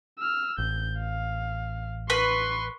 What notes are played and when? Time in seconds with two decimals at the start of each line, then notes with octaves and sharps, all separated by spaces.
0.19 E6 F6
0.58 A1 G6
1.00 F5
2.10 B4 C6 C#6